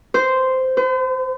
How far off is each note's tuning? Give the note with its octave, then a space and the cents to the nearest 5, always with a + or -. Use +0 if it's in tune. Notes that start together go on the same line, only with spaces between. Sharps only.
C5 -10
C5 -45